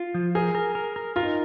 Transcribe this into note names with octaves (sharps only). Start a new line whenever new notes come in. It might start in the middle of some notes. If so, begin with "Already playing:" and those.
Already playing: F4
F3
G#4 A#4
A#4
A#4
A#4
F4 A#4
D#4